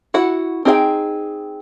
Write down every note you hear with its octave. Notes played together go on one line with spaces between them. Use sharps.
E4 F#4 F#5
C4 D#4 G#4 D#5 G5